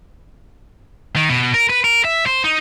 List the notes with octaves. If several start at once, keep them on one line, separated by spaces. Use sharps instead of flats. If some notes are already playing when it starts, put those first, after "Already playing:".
D#3
B2
A#4
B4
A#4
E5
C5
D#4